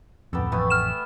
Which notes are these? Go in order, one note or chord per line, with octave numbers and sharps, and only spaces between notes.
D1 F2 B3 G4 A4
A1 F2 A3 B3 G#5
F6 E7